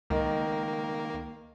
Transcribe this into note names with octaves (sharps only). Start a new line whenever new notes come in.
C#2 D#3 A#3